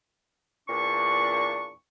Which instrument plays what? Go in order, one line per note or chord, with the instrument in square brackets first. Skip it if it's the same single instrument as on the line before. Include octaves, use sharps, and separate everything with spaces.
[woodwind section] E2 A#2 D4 C#6